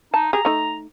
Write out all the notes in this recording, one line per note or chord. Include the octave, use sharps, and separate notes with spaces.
D#4 A5
G4 G#4 A#5
A3 D#4